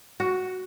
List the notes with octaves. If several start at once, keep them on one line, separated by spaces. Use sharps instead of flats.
F#4